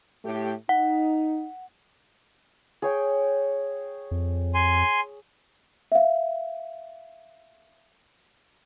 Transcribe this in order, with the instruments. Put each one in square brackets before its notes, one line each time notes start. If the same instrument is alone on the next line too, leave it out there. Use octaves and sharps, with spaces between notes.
[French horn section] A2 A3 G4
[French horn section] D#4 [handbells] F#5
[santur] G#4 C#5 G5
[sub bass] F2
[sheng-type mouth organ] G#5 C6
[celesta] E5 F5